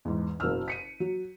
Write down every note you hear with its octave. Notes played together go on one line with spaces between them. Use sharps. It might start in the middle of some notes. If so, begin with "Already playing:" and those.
E2 G#2
F#1 B2 A#4 E6 F6
B6 C#7 D#7
F#3